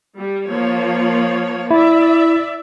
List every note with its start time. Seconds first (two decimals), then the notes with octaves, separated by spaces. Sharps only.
0.14 G3
0.46 F3 A#3 C#5
1.71 E4 D5 E5